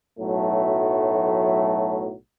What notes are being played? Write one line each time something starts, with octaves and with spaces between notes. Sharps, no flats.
B1 A2 F#3 A3